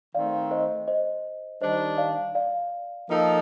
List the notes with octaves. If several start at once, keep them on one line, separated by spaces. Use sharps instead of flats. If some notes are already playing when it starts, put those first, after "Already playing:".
D#3 A3 C4 D5 F5
C5 D#5
C5 D#5
D#3 G3 D4 C5 D#5
D5 F5
D5 F5
F3 A#3 D#4 A4